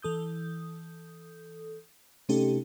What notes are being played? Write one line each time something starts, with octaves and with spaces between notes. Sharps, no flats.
E3 A4 D#6 G6
C3 A3 C#4 D#4 G4 A4